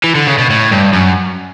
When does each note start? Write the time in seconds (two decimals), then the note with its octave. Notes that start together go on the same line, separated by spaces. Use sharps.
0.04 E3
0.15 D3
0.27 C#3
0.38 B2
0.50 A2
0.71 G2
0.93 F#2